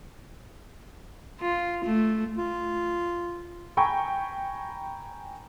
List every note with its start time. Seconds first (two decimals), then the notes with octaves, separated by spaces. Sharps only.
1.41 F4
1.85 A3
2.37 F4
3.77 G5 G#5 A#5 B5 C#6